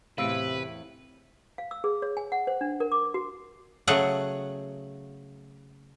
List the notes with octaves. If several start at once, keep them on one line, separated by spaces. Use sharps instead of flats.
E2 A2 C3 B4 C5 F5 E6 D7
F5
E6
G#4
C#5
G#5
F#5
C5
D4
A#4
D6
F#4
C#3 F#3 A3 G#4 F#5